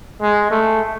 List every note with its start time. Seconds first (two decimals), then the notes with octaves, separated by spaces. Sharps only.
0.22 G#3
0.51 A3